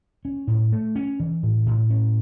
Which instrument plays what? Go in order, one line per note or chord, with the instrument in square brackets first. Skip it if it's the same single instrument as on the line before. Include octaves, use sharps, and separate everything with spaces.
[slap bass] C#4
A2
A3
C#4
E3
A2
A2
C#4